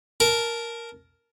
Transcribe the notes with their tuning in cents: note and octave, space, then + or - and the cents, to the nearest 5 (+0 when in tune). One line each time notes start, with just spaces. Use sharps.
A#4 +0 A5 -20